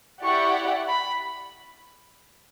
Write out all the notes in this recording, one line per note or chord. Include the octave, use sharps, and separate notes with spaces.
E4 G4 D5 F#5 C#6
B5